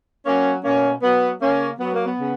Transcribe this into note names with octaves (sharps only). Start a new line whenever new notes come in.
F#3 A#3 C#4
B2 A#3 C#4
F#3 B3
C#3 A#3 C#4
F#3 B3
A#3
B3
C#3